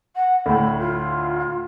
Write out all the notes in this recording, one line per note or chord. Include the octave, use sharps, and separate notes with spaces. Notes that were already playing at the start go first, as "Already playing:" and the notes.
F#5
D2 A2 B5
F4